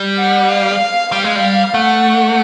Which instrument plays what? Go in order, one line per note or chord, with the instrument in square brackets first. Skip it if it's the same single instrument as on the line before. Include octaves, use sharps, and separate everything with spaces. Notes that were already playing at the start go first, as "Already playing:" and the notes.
Already playing: [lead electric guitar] G3
[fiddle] F#5
F5
[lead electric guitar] G3 [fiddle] F5
[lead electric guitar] G#3
G3
[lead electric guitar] A3 [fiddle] F#5